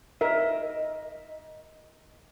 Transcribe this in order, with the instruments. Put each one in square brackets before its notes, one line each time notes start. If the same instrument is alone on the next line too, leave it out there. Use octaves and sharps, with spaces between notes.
[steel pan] A#4 E5 [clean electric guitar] D#5